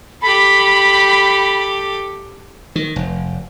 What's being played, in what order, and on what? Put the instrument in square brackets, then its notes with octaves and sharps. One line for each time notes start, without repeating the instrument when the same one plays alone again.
[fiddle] G4 A4 [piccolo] B5
[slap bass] D#3
F1